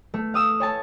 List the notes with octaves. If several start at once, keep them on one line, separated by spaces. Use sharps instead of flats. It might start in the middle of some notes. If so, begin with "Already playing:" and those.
A3
F5 D#6 E6
C#5 G#5 A5